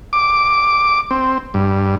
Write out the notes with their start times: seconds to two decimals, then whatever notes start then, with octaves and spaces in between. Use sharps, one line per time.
0.13 D6
1.11 C4
1.54 G2